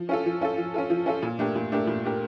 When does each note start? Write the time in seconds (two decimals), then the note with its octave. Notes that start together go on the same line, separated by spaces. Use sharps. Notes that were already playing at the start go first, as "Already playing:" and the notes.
Already playing: F3
0.09 C#4 F4 A4
0.26 F3
0.41 C#4 F4 A4
0.58 F3
0.74 C#4 F4 A4
0.90 F3
1.06 C#4 F4 A4
1.23 A#2
1.39 A3 D4 G4 A#4
1.55 A#2
1.72 A3 D4 G4 A#4
1.87 A#2
2.04 A3 D4 G4 A#4